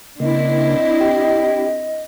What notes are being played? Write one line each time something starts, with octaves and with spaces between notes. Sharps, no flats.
C#3 A#3 C4 D4 E4 D#5
G4